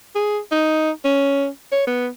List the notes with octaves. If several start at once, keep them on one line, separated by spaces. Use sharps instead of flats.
G#4
D#4
C#4
C#5
B3